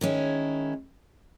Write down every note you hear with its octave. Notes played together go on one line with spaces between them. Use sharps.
D#3 G#3 C#4 E4